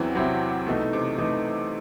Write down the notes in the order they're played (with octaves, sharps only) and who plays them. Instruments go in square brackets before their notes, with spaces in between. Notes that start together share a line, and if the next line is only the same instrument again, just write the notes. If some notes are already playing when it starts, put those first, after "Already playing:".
Already playing: [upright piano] E2 E3 [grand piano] F#3 C4 E4
[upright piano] C3 [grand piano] F#3 C4 E4
[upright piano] B2 [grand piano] E3 A3 D#4
[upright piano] C3
[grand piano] E3 A3 D#4